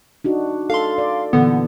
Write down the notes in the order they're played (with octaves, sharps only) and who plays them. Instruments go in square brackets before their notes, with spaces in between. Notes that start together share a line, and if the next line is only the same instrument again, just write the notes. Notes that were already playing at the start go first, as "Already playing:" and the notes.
[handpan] D4 D#4 F#4
[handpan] A4 [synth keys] F5 C6
[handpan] D5
[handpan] A#2 E3 [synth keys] D3 B3